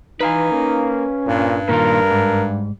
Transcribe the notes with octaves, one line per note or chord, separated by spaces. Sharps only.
E3 D#4 B4 F5 G#5
A#3 C#4
G2 A#2
A#2 D#3 G3 F4 A#4
G#2